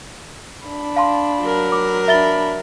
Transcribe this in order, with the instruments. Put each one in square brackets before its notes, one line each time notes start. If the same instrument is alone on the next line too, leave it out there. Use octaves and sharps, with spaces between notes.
[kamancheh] D4 B5
[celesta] F5 A5 C6
[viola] F#3 A#4
[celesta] D6
[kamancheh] D4 B5 [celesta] E5 A6 G7